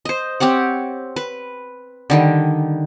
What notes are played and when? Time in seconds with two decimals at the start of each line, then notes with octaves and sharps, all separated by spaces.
0.05 C5 D#5
0.40 C4 G4 C#5 F#5
1.16 B4
2.10 D3 D#3 G3